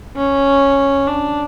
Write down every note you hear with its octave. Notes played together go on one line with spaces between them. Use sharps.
C#4
D4